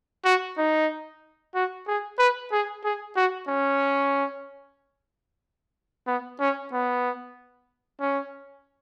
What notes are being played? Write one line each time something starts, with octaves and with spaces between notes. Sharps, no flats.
F#4
D#4
F#4
G#4
B4
G#4
G#4
F#4
C#4
B3
C#4
B3
C#4